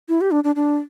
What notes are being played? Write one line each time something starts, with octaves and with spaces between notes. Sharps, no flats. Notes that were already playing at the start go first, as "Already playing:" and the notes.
E4
G4
D4
D4
D4